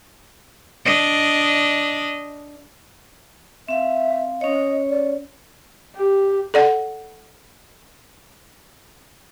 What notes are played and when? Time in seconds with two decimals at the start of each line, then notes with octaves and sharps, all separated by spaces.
0.85 D4 D#5
3.68 C4 E5 F5
4.41 C#4 C#5 D#5
4.90 D5
5.96 G4
6.54 A4 D5 F#5